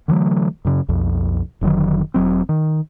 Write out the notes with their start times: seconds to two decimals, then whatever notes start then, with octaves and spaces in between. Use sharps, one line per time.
0.08 D3 E3 F#3 A3
0.65 F#2 C#3
0.89 B1 F2
1.61 F1 D3 D#3 F#3
2.14 E1 F#3 C4
2.49 D#3